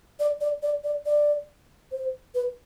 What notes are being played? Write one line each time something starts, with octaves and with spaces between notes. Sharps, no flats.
D5
D5
D5
D5
D5
C5
B4